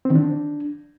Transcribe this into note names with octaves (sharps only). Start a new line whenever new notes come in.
C4
D#3
D4